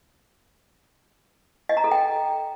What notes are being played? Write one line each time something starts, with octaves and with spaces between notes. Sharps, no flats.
D#5
A#5
A4
G5